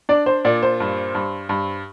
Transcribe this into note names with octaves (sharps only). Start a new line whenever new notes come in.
D4 D5
C5
A#2 D5
C5
G2
G2
G2